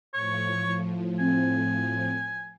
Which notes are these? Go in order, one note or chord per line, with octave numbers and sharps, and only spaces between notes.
A2 F3 C#5 C#6
C4 G#5